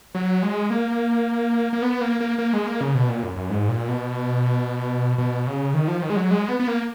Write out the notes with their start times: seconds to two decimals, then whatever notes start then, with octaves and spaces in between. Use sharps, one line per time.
0.15 F#3
0.43 G#3
0.70 A#3
1.73 A#3
1.82 B3
2.01 A#3
2.20 A#3
2.38 A#3
2.53 G#3
2.67 A#3
2.81 C#3
2.95 B2
3.09 A#2
3.23 F#2
3.36 F#2
3.50 G#2
3.69 A#2
3.88 B2
5.18 B2
5.47 C#3
5.74 D#3
5.88 F3
6.02 D#3
6.10 G#3
6.16 F#3
6.31 G#3
6.48 B3
6.60 B3
6.68 A#3